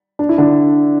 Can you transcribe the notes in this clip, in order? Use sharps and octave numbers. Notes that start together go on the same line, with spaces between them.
D4
E4
D3 D4